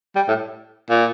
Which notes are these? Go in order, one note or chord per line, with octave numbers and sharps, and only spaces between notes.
G3
A2
A#2